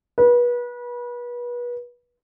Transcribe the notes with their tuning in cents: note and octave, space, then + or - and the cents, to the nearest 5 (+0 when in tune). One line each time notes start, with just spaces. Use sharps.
B4 -30